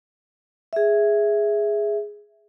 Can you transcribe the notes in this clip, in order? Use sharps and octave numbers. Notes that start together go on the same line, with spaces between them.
G#4 E5